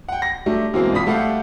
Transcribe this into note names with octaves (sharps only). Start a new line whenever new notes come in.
F#5 G5
A#6
F#3 G3 A3 D4
B2 E3 F#3 G#3 A#3 C4
A#1 D4 F4 B5 D#6 B6
G3 A3 G4 A4 F5 F#5